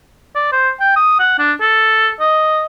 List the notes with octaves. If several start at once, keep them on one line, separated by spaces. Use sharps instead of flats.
D5
C5
G5
D#6
F#5
D4
A4
D#5